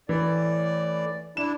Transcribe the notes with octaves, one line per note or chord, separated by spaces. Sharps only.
A2 E3 D5
D4 E4 E7